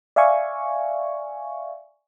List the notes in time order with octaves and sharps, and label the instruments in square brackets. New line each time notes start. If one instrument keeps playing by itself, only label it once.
[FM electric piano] D5 E5 F5 G#5 C#6